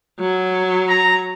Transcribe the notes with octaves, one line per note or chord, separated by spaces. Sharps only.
F#3
A#5